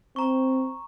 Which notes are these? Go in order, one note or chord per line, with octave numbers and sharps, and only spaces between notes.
C4 A#5 C#6